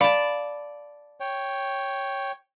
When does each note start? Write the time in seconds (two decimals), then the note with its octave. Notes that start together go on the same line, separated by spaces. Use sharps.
0.01 D5 F5 A5 B5
1.20 C#5 G5